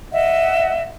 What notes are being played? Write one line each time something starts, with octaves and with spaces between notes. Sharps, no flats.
D#5 E5 F#5